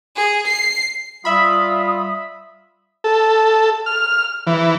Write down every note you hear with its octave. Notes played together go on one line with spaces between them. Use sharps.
G#4
C7
G3 F4 E5 B5 D#6
A4
F6
E3